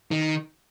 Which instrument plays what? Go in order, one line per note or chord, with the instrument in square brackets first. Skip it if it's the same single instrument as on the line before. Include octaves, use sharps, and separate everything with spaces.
[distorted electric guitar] D#3